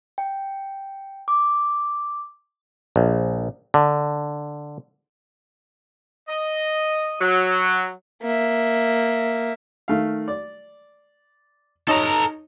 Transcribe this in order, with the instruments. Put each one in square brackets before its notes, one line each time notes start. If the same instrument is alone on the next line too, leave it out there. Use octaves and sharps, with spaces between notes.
[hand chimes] G5
D6
[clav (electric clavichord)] A#1
D3
[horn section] D#5
F#3
[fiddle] A#3 E5
[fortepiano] D#3 A3 F5
D5
[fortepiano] D#4 C#5 D#5 [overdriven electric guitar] A4 A#5